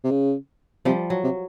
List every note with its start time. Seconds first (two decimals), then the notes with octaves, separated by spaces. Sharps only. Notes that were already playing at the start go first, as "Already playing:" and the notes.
0.04 C3
0.11 C#3
0.85 C3 F3 G3
1.10 F#3
1.24 C3